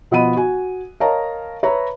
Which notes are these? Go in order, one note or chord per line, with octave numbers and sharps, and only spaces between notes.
B2 F3 B3 D#5 B5 D#7
F#4 G#5
A#4 C#5 D#5 F5 A5 A#5
B4 C#5 E5 A#5 B5